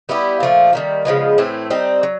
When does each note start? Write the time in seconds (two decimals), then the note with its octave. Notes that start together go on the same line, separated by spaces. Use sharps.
0.09 G3 B3 E4 G4
0.40 A#2 F3 A3
0.73 D#3 G3 A#3
1.05 C#3 F3 G#3 B3
1.38 A2 E3 A3 C4
1.70 G3 C4 D#4
2.03 F#3